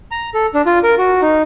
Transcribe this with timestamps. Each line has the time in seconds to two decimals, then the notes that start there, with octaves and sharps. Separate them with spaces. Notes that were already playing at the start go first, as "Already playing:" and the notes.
0.11 A#5
0.34 A4
0.54 D4
0.66 F4
0.84 A#4
0.98 F#4
1.22 D#4